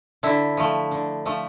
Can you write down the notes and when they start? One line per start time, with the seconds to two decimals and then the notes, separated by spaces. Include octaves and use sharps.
0.23 D3 E4
0.57 F3 A3
0.91 D3
1.26 F3 A3